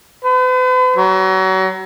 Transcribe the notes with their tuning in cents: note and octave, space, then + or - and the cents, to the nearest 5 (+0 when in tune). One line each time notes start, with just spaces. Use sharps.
B4 +45
F#3 +30